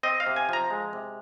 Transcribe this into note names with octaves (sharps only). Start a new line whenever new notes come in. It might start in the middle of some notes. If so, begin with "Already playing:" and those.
C4 D#5
F5
C3
G#5
F3 A#5
G#3
C3